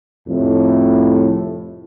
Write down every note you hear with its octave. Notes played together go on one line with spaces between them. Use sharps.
C2 F2 A2